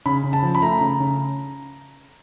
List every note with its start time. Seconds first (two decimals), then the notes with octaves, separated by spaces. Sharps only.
0.06 C#3 B5
0.24 C#3
0.33 A5
0.42 F3
0.55 B5
0.62 A3 A#5
0.80 C#3
1.00 C#3